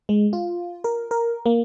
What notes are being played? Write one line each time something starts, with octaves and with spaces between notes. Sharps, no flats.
G#3
F4
A#4
A#4
A#3